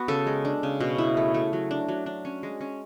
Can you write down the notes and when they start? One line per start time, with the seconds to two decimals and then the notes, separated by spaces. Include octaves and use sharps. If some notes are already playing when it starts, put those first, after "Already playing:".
Already playing: B3 F#4
0.08 C#3 A4
0.27 G#3
0.45 D4
0.63 C#3
0.80 B2
0.98 E4
1.17 A3
1.34 A3
1.53 F#3
1.71 D4
1.89 F#3
2.06 D4
2.25 C#4
2.43 G#3
2.61 C#4